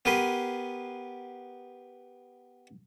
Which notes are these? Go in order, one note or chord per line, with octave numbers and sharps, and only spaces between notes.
B3 G4 A#4 B4 G#5 C6